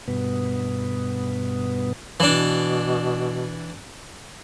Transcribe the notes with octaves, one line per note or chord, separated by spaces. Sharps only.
G2 B2 B3
B2 E3 D4